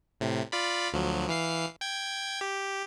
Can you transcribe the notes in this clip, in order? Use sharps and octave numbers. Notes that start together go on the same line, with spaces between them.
A2 C3
F4 D5 B5
D2 F3 F#3
E3 F5 C7
G5 G#6
G4